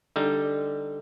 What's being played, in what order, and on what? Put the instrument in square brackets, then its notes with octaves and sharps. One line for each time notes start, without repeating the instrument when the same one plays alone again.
[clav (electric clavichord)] D3 G3 D#4